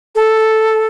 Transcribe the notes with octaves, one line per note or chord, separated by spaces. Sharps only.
A4